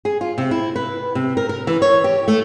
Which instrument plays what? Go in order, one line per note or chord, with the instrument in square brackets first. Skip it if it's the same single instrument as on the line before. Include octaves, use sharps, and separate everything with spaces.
[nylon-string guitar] G#4
F4
C3
E4
B4
C3
A#4
A#4
E3
C#5
G4
A3